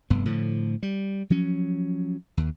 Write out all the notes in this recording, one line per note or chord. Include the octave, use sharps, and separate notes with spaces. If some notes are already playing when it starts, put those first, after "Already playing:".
F1 G2 B3
A2 D3 F3
G3
F3 F#3 C#4
D#2